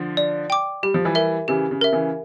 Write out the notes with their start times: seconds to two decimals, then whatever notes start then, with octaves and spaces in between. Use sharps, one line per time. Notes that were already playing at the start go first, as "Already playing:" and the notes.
Already playing: D3 F3
0.17 D5
0.50 G5 D6
0.83 G3 G4
0.94 F3
1.05 E3 G3
1.15 A#4 E5
1.48 C#3 E3 G4
1.71 C#3
1.81 A#4 E5
1.92 C#3 E3